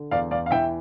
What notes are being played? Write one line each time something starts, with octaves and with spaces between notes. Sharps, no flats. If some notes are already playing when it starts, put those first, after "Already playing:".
Already playing: D3
E2 D5 F5
E2 D5 F5
F5
E3 E5 G5